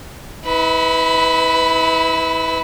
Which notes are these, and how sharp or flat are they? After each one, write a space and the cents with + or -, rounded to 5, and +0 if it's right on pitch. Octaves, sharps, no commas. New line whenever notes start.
E4 -35 B4 +10